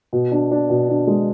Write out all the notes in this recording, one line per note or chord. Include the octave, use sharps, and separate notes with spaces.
B2
D4
D4
B2
D4
G#3